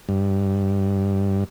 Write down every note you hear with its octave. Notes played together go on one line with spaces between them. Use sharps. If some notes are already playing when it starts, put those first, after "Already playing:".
G2